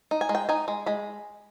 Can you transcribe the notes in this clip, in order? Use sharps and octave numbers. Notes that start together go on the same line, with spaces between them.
D#4
G#5
G#3
G5
D#4 G#5
G#3
G#3 B5